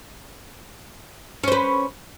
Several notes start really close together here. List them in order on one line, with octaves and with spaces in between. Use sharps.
C#4 C5 B4